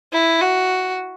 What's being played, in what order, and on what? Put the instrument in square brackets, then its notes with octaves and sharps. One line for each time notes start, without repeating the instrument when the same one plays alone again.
[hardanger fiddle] E4
F#4